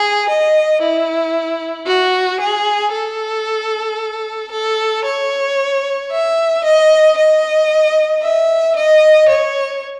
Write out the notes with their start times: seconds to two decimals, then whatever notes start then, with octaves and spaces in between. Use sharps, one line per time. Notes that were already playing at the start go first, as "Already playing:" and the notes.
Already playing: G#4
0.29 D#5
0.82 E4
1.87 F#4
2.41 G#4
2.93 A4
4.52 A4
5.05 C#5
6.11 E5
6.64 D#5
7.17 D#5
8.23 E5
8.76 D#5
9.29 C#5